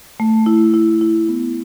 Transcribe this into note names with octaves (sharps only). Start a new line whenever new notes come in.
A3
E4
E4
E4
B3